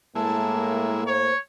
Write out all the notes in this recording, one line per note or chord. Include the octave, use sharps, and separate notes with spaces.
A2 G#3 A#3 E4 A5
C5 C#5